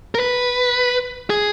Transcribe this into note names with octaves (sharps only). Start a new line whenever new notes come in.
A#4
B4
G#4